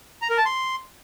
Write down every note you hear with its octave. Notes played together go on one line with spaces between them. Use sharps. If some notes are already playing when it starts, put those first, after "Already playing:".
A#5
A#4
A5
C6